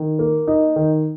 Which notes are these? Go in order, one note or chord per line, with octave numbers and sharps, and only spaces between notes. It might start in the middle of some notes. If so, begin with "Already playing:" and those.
Already playing: D#3
A#3
D#4
D#3